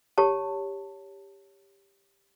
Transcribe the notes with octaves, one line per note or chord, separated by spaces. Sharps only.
G4 C#5 A5